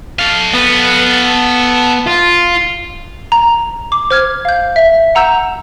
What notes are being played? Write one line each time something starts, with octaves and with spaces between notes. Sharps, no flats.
A4 F5
B3
F4
A#5
D6
C5 F6 G#6
F5 G6
E5
F#5 A#5 E6 G6 E7